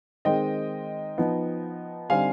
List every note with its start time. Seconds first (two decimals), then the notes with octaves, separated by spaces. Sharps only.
0.25 D#3 G#3 C4 D#4 D#5 G5
1.18 F3 B3 D#4
2.10 D3 G3 C4 D#4 F5 G#5